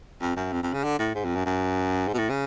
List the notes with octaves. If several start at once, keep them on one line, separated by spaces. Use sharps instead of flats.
F2
F#2
F2
F2
C#3
D3
A2
G#2
F2
F#2
F#2
G#2
B2
A2
C#3